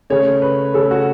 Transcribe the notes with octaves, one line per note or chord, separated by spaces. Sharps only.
C#3 A3 C#4 C#5
B4
C#3 A3 C#4 A4
F#4